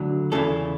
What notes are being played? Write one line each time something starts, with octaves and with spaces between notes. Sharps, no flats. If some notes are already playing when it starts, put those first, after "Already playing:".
Already playing: D2 D3 F#3
E2 C#3 E3 A4